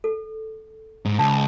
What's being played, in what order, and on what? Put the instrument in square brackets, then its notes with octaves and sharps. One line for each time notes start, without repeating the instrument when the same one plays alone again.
[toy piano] A4
[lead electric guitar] G#2
[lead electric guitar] C#2 [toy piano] A5